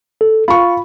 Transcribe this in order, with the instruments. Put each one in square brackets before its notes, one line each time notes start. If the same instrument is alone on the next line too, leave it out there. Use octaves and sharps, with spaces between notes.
[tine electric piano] A4
[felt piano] F4 C#6 [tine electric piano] B5